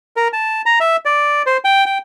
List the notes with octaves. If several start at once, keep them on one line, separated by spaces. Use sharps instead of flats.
A#4
A5
A#5
E5
D5
C5
G5
G5